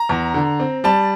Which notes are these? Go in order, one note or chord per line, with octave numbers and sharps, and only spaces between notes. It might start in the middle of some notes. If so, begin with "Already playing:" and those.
Already playing: A#5
E2
D3
C4
G3 A5